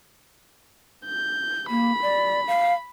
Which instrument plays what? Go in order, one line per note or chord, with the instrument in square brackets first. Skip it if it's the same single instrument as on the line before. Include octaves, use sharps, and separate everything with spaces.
[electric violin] G6
[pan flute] A#3 [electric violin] B5
[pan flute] D5
F5